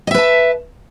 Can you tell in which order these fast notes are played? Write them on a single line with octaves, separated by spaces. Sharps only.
D#5 E5 B4 A5